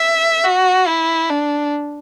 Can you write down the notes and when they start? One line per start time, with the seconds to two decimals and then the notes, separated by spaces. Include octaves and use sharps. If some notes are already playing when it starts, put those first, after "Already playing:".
Already playing: E5
0.44 F#4
0.88 E4
1.30 D4